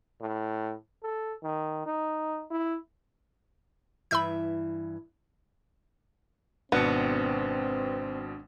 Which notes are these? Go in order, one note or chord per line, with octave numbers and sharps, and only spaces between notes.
A2
A4
D#3
D#4
E4
G2 E3 E5 B5 E6 G6
G#1 B2 B3 C4 D4 C#7